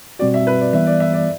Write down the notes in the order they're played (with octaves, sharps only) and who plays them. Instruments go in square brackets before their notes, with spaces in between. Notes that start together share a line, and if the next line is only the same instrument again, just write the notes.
[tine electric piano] B2 G3 C4 F#4 [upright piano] D5
[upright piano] E5
B4
D5
[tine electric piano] E3 G3 B3 [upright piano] E5
[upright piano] D5
E5
D5